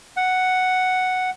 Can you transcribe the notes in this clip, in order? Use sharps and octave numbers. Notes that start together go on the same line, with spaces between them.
F#5